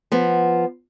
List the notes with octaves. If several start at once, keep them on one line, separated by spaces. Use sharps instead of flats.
F3 B3